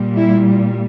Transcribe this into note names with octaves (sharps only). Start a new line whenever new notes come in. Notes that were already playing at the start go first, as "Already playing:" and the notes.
Already playing: A#2 G3
E4